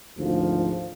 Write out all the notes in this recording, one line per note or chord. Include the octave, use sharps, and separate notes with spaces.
G#1 D2 G#2 F3